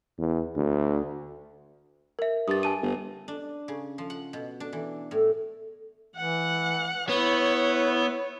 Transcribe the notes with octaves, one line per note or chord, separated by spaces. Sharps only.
E2
D2
A#4 E5
G2 D#6 A6
G#5 A5 D#7
G1
D4
C#3
F3
F#5
B2
D4
E3
A2
E3 F#5
B3 E4 C#5